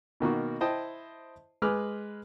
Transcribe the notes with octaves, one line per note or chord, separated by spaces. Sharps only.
B2 D#3 A#3 F#4
E4 C5 D#5 G5 A5
G#3 G#4 B4 D6 F6